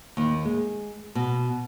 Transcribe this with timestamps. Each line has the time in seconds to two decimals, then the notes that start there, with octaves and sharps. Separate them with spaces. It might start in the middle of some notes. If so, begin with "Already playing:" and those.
0.17 D#2
0.45 G#3
1.15 B2